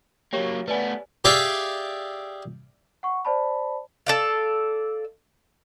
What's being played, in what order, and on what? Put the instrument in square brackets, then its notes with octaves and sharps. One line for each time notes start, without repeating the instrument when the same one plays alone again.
[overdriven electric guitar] F#3 A#3 [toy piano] G4 C#5 G5
[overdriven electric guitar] A3 B3 [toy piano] B4 D5 G#5
[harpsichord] G4 G#4 D5 E5 F5 G5
[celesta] F#5 C#6
C5 D5 A5 B5
[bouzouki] A4 D5 F5